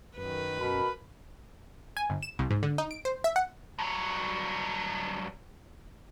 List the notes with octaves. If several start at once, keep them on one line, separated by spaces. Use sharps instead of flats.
F#2 D#3 B4
B2 A#4 B5
G#5
G1
E7
C2
G#2
D3
D#4
D7
C5
E5
F#5
G2 F#3